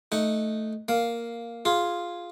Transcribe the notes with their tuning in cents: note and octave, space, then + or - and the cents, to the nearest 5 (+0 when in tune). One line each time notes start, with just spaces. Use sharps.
A3 +0 D#4 +0 F#5 +0
A#3 +0 F5 +5
F4 +0 G#4 +0 F5 +0